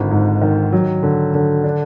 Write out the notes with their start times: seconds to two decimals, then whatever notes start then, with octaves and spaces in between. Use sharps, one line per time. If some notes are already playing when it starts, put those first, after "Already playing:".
Already playing: G#1 D3 F4
0.11 G#2
0.42 D#3
0.72 F#3
1.03 D3
1.34 D3
1.64 D4